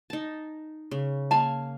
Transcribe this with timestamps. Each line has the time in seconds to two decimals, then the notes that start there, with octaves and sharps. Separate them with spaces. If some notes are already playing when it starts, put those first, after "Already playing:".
0.10 D#4 A5
0.91 C#3
1.31 A#3 F5 G#5 A5